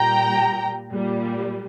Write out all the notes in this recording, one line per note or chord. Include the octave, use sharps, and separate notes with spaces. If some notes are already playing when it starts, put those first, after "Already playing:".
Already playing: A#2 G3 G5 A#5
A#2 G3